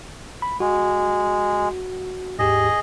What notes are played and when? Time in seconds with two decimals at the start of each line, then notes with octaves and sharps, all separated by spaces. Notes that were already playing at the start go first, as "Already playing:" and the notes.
0.42 B5
0.60 G#3 F#4
2.39 D#2 G#2 G4 G#4 D#5